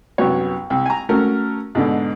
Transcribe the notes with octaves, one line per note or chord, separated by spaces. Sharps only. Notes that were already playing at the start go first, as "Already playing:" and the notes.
C2 F#2 F#3 B3 C#5
C2
G#5 A#5
A3 C#4 F#4 A#4
G#2 B2 D3